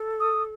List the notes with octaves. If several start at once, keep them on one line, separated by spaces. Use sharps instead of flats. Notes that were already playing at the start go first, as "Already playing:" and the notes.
Already playing: A4
D#6